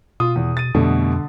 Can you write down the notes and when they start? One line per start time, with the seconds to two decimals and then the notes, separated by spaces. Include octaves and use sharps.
0.20 B2 F4 D#6
0.36 E2
0.57 A6 D#7
0.75 F2 B2 D3 G3 A3